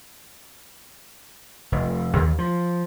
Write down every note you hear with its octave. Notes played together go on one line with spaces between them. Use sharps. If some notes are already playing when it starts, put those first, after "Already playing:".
F1
D#2
F3